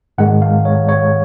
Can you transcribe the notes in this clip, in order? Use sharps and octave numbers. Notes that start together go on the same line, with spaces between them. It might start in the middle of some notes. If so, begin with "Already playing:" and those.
G#2 D#3 G#3 F#5
F5
C#5
C#5